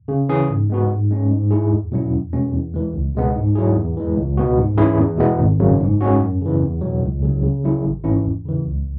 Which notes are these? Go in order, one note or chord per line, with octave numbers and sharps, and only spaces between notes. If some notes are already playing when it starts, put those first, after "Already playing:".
C#3
E3 C#4 G#4
G#2
G#3 B3 F#4
G#2
G#3 C#4
G#2
G#3 E4 G#4
E2
B2 F#3 C#4 E4
E2
B2 G#3 C#4
E2
E3 G#3
C#2
B2 G#3 B3
G#2
F#3 E4 G#4
E2
E3 G#3
C#2
B2 B3 F#4
G#2
E3 C#4 E4 G#4
E2
B2 G#3 B3 E4
G#1
F#2 C#3 F#3
G#2
G#3 C#4 F#4
F#2
C#3 E3
E2
B2 F#3
C#2
C#3 F#3
C#3
F#3 E4 G#4
G#1
G#2 E3 C#4 E4
E2
C#3 E3
C#2